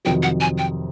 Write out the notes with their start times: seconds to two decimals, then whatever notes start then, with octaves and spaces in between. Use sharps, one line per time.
0.05 F2 C3 D#3 F#3 G5
0.23 F#5
0.41 G#5
0.58 G5